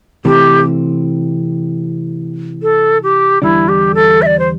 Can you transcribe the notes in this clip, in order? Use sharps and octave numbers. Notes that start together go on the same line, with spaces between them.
C3 E3 A3 C4 G4
A4
G4
E2 D3 G3 D4 E4
G4
A4
E5
D5
C5